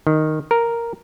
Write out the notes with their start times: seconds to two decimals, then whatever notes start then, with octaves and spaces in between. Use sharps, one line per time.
0.07 D#3
0.51 A#4